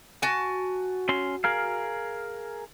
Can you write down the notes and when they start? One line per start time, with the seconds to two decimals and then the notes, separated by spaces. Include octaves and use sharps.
0.22 F#4 G#5 A5
1.09 C#4 C6
1.44 G#4 A#4 F5